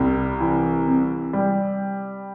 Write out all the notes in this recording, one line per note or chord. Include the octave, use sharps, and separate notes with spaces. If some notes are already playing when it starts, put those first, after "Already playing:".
Already playing: C2 G3
E3
C3
G3